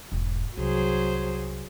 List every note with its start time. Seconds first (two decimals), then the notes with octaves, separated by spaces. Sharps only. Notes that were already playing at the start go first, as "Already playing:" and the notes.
0.12 E1 G#2
0.57 C2 F#3 G#4 C5